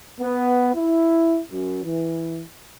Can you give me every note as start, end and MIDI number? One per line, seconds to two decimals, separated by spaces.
0.21 0.70 59
0.75 1.40 64
1.51 1.81 42
1.84 2.43 52